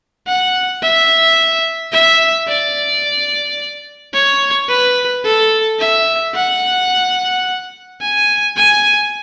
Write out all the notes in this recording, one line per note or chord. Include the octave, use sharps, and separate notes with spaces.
F#5
E5
E5
D5
C#5
B4
A4
E5
F#5
G#5
G#5